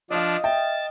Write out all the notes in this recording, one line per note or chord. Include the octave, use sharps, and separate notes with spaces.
F3 D4 D#5 F5
E5 G5 A5